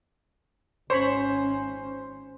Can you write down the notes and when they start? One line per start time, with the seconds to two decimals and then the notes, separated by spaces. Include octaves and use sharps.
0.90 G#1 C#4 C5 C#5 B5